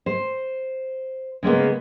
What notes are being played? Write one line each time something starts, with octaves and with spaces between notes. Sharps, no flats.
C5
C#3 G#3 A#3 B3